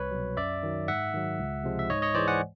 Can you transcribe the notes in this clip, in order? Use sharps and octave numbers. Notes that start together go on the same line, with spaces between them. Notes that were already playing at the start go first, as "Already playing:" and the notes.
Already playing: C2 B4 C#5
B2 F#3
F#2 D5 E5
D#3 F#3
G#2 E5 F#5
D#3 F#3
C#2
C3 F3 G#3
E5
G#2 C#5 D#5
C#5 D#5
E3 G#3 C5 D5
F#5 G#5